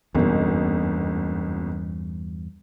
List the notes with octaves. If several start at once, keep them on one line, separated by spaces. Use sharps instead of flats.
F#1 B1 E2 G2 B2